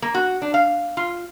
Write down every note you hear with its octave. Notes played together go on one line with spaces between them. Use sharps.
A#3
F#4
D4
F5
F4